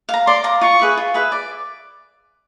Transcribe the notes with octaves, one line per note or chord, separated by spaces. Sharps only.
F5 A#5
D5 C6
F5 A#5
F4 C#6
G#4 B4 E5
F4
G#4 B4 E5
D5